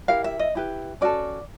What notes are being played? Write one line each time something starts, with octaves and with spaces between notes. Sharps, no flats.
E4 G4 A#4 F5
E5
D#5
E4 G4 B4
C#4 F#4 A4 D5